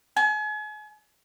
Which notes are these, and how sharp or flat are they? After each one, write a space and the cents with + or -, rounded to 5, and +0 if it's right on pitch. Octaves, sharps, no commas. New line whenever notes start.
G#5 +40